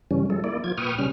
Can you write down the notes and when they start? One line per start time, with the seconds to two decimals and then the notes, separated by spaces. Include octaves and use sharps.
0.11 G2 C#3 E3 G3 C#4
0.30 F3 G3 G#3 A4
0.44 A#3 E4 D5
0.64 F3 F4 G#6
0.78 A#2 B4 G5 C#6 D#6 F6
0.98 C#3 G3 C#4 F6